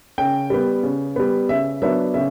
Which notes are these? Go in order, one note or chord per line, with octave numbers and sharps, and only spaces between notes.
C#3 G5
G3 B3
C#3
G3 B3
C#3 E5
F#3 B3 D4 E5
C#3 E5